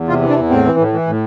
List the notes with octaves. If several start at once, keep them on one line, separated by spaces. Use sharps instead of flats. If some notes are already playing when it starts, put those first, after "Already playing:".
Already playing: E2
C3 F4
E3
D4
E2
A2 C4
E3
A2
E3
A2